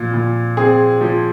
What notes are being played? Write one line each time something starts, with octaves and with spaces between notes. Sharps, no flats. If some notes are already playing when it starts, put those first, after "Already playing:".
Already playing: A#2 F3
A#2
C4 G#4
F3